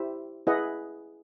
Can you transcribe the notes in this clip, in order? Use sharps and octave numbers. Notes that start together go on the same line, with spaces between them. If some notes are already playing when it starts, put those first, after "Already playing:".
Already playing: E4 G4 C5 E5
E4 G#4 B4 D#5 F#5